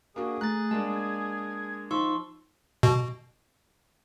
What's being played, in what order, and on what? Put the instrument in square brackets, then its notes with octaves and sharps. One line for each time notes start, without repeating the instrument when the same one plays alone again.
[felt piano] A#3 D4 F#4 [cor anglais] G#4
[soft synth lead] A3 [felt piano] A#5 [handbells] F#6 A6
[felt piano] G#3 A#3 D4 [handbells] A5
[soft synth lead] G#6
[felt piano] F3 [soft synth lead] D#4 [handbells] C6 C#6 E6
[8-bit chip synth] B2